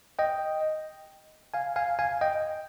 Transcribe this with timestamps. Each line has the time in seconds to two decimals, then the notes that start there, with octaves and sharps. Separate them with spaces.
0.19 D#5 G5
1.54 F5 G#5
1.76 F5 G#5
1.99 F5 G#5
2.21 D#5 G5